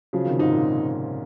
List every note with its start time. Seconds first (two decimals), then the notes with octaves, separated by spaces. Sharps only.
0.13 C#3 F3 F#3
0.26 C3 D#3
0.39 G#2 C3 D#4
0.52 A#2